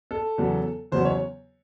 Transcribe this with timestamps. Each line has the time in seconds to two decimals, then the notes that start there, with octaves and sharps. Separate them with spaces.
0.11 A4
0.38 E2 C#3 F#3 B3
0.92 E2 C#3 F#3 B3 C5
1.05 C#5